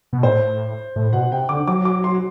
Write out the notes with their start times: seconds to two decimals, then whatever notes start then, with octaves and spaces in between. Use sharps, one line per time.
0.13 B2
0.23 A2 C5
0.96 A2
1.13 B2 F#5
1.32 C3 G5
1.49 D3 D6
1.67 F#3 D6
1.85 D6
2.04 C6